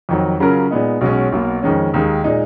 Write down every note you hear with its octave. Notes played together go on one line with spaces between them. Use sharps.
F2 D#3 F#3
C#3 F#3 C#4 F4 A#4
A#2 G#3 B3 D#4
B1 B2 G#3 C#4
B1 B2 A#3
F2 D#3 G#3 C#4
D#2 D#3 G#3
A#2 G#3 D#4